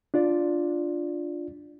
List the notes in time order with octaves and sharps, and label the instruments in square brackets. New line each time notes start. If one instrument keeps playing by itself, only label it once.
[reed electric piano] D4 F4 D5